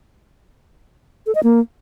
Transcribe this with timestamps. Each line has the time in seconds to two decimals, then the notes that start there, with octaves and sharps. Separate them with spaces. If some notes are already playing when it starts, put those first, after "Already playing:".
1.27 A4
1.35 D#5
1.43 A#3